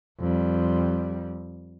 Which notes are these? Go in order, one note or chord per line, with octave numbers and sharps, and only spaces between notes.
F2 G3